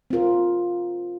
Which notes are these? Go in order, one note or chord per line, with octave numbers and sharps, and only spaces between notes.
C4 F4 A#4